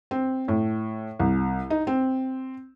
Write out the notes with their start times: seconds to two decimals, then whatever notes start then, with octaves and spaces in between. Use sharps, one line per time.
0.11 C4
0.48 A2
1.19 C2
1.70 D#4
1.87 C4